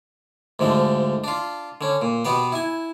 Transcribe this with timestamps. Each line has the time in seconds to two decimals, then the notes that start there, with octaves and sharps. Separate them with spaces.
0.59 D2 G#2 D3 F3
1.24 D4 F4
1.81 D3 C#4
2.02 A#2
2.25 B2 B3 G4 B4
2.52 E4 G#5